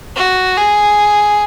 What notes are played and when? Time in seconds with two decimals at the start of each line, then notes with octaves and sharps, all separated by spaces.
0.16 F#4
0.57 G#4